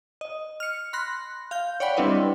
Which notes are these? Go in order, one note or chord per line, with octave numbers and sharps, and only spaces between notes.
D#5
F6 C#7
B5 C6 F#6 A#6
F5 G6
C#5 D5 F#5 G5 B5
G3 C4 D4 E4 B4 D#5